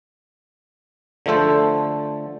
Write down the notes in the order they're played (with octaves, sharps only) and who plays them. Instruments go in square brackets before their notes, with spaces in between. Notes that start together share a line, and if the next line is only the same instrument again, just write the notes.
[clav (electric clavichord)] D3 F3 A3 A4 C5